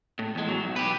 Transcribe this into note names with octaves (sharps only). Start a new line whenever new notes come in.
A2
E2 G#3
F#3
B1
G4 B4